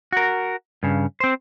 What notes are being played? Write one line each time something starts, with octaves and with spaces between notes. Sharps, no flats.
F#4 A#4
G2 C#3
C4 C5